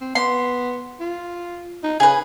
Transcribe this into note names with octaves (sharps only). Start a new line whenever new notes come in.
C4
B3 C6
F4
D#4
C#3 G#4 B4